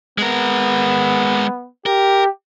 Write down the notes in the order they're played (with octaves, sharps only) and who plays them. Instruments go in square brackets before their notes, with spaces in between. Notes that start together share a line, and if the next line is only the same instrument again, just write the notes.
[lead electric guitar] G#3 A#4 [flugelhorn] B3
[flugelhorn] G4 [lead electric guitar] A#4